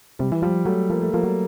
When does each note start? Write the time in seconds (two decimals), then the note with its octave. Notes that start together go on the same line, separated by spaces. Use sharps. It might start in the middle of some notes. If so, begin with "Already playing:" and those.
0.19 C3 G3
0.32 E3
0.42 F3 G3
0.66 F#3 A3
0.90 F3 A#3
1.02 A3
1.13 F3 A#3
1.24 F#3